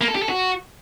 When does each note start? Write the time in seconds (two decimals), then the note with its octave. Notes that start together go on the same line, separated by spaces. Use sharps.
0.01 A#3
0.08 A4
0.15 G4
0.22 A4
0.29 F#4